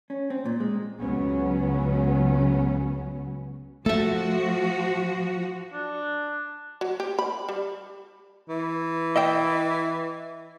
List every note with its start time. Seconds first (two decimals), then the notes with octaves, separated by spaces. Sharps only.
0.10 C#4
0.30 C4
0.45 A#2
0.60 G#3
1.01 C#2 C#3 F#3 B3 C#4
3.86 F3 A3 F#4 A4 E5
5.73 D4
6.81 F#3
7.00 G4
7.19 B5
7.49 G3
8.49 E3
9.16 D#5 E5 G5